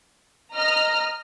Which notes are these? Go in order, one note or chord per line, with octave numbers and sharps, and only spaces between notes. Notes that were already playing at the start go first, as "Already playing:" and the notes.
D#5 A#5 F6